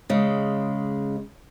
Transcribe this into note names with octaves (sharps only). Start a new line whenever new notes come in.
C#3 G#3